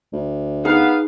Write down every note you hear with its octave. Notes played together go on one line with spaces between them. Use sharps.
D2
B3 D#4 G#4 F5